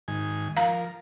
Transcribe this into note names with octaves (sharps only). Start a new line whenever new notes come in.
G#2 D#3 G#5
F3 A#4 F5 A#5